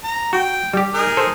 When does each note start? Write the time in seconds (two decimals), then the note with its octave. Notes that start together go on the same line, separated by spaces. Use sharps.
0.04 A#5
0.33 F#4 G5
0.73 G3 G4
0.94 D#4 G#4 A#4
1.17 A4 C5